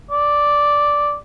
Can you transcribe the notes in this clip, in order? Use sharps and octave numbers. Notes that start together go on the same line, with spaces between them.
D5